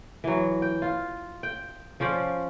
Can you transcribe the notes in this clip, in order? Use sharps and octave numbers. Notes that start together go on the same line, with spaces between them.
E3 F#3
G5
F4
G5
F3 C#4 C5 D5